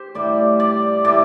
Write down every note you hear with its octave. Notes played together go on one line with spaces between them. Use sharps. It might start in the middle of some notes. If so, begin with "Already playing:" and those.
Already playing: G4 C5
A2 G3 D5
D5
A2 G3 D5